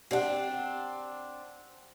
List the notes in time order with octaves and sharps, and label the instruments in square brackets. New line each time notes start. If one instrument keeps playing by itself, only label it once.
[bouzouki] C4 D4 [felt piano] G4 D5 F#5